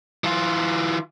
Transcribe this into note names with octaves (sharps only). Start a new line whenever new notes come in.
E3 F4